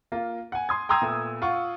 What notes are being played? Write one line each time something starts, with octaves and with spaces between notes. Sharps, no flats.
A#3 F4
F#5 G#5
C6 D#6 G#6
G5 A#5 C6 D#6 E6 G#6
A#2 A3 B3
F4 F#5 C#6